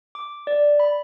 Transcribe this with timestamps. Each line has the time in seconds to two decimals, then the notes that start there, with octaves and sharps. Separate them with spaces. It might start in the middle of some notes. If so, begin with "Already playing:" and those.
0.15 D6
0.47 D5
0.80 B5